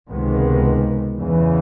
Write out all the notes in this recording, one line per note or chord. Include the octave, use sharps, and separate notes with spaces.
C#2 C3 D#3 G#3 B3
E2 C#3 E3